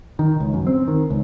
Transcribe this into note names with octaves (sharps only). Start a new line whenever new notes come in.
D#3
C#2
F#2
C4
D#3
C#2